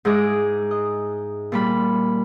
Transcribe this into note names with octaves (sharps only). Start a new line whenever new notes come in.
G#2 G#3 E4 G#4 D6
D#5
A#2 G3 B5